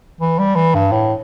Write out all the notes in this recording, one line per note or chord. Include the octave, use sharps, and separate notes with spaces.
E3
G3
E3
G2
A2